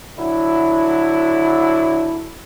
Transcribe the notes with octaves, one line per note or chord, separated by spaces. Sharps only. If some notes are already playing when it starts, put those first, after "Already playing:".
D3 F#3 E4